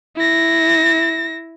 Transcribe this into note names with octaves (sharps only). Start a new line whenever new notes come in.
E4 A#6